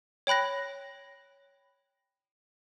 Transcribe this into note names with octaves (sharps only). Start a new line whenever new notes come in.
C#5 G5 B5 F#6 A#6